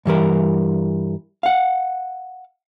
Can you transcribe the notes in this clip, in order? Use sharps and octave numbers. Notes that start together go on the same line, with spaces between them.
G2 E3 G3 A#4
F5 F#5